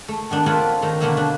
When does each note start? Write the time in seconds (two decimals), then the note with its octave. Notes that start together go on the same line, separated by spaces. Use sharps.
0.08 A3
0.30 D#3 B3 D4
0.46 C4 D4 F4 B4 C#5 D5
0.82 D#3 A3 A#5
1.01 B2 D3 A3 A#3 E4 E5
1.17 D4